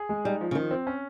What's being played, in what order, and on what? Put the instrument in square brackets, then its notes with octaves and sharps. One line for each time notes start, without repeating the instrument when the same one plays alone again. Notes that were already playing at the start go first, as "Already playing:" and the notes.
Already playing: [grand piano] G#4
G#3
[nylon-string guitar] G3 [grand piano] D#4
[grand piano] F3
[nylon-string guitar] C#3
[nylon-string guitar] D#3 [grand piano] F3
[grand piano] C4
C#4